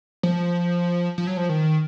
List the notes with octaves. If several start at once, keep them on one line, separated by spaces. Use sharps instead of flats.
F3
F3
F#3
F3
D#3